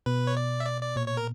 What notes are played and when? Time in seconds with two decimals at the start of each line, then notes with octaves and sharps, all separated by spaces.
0.06 B2 B4
0.27 C#5
0.37 D5
0.60 E5
0.66 D5
0.82 D5
0.96 A#2 C#5
1.07 C#5
1.17 A#4